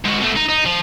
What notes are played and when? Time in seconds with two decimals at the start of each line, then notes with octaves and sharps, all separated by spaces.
0.05 G#2 F#4
0.21 B2 A3
0.36 D#4
0.49 D#4
0.66 F3